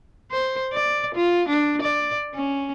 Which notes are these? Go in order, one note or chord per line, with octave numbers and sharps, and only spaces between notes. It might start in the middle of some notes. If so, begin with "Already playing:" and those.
C5
D5
F4
D4
D5
C#4